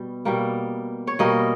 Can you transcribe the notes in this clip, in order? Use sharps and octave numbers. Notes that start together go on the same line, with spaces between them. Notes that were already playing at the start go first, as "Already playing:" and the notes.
Already playing: B2 G3
B2 G3 A#3
C#5
B2 G3 A#3 D#5